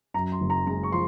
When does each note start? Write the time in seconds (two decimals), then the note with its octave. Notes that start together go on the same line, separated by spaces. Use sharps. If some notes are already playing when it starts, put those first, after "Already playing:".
0.14 F#2 A#5
0.32 C6
0.41 F#1
0.50 A#5
0.67 G#3 A#5
0.83 C#6
0.92 F3 C6